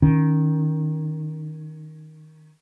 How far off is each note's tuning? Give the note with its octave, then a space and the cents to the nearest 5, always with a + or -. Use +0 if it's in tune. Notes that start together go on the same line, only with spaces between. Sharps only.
D#3 +0 C#4 +10